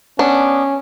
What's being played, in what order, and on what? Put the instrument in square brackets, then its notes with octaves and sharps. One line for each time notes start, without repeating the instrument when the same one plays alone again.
[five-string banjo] B3 D4 A5 [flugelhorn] C#4